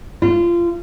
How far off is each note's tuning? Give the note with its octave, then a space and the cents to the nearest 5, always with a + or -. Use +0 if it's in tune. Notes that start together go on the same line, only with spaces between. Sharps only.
F4 -25